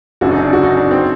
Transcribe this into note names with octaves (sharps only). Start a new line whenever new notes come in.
F#1 F#2 D3 F#4
D#4
D4
F#4
D#4
D4
C4